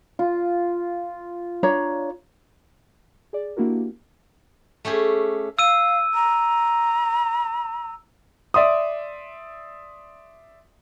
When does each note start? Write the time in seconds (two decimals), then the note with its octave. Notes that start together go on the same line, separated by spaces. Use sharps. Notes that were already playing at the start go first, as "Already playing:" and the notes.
0.19 F4
1.63 D4 C#5 A#5
3.33 G#4 D5
3.57 A#3 D4 E4 F#4 G4 A#4
4.85 A3 C#4 G4 G#4
5.59 F5 E6 D#7
6.14 A#5
8.54 D5 E5 C6 D#6